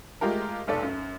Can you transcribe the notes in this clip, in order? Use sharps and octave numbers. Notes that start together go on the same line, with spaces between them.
G#3 A3 F4 G4 A#4
F1 B1 A4 D5
F#2